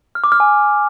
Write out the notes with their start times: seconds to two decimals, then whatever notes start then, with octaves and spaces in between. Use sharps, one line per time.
0.15 F6
0.24 D6
0.32 F6
0.40 G#5